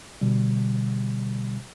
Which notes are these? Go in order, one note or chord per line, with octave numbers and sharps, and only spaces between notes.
B2 D3 G3